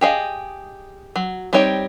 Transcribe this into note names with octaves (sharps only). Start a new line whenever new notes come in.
G4 G#4 D#5 F5
F#3
G3 C4 D#4 C#5 G5